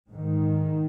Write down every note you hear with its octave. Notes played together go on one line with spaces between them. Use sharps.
G#2 D#3